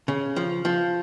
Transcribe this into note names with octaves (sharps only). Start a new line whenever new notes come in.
C#3
F3
F3